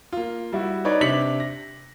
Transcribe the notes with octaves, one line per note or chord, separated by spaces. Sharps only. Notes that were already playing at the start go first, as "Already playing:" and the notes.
A#3 F4
G3 E4 F#4
D#4 B4 C#5 D5
C3 D4 D6 B6 C#7 F#7
A#6